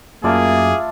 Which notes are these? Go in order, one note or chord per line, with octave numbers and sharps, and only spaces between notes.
F#2 A3 A#3 F4 G#4 D5